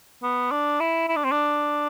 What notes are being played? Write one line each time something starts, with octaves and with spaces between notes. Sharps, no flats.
B3
D4
E4
E4
D4
C4
D4